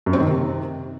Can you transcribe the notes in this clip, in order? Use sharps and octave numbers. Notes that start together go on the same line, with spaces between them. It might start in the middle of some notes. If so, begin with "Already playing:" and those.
F#2
C4
D#3
C3